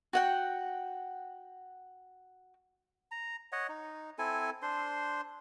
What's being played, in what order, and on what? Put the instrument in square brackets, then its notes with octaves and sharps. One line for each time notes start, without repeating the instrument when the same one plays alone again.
[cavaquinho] F#4 F#5 G5
[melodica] A#5
C#5 D#5 F#5
D#4
C4 E4 A4 G#5
D4 C5 C6